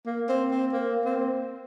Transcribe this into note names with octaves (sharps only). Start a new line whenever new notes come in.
A#3
C4
C4
A#3
C4